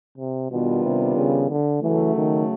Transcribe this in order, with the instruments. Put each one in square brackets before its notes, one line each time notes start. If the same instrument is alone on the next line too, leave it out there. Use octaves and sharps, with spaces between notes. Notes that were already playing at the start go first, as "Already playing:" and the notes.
[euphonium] C3
[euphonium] B2 [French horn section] D#3 G3 B3 D4 F4
[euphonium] C3
C#3
D3
[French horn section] C#3 F#3 A3 [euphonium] E3
[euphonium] D#3